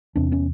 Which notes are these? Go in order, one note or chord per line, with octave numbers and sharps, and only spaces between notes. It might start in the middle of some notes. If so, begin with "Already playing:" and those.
E2 C3 C4 D4
B3 C#4